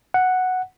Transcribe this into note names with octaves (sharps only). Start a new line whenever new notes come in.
F#5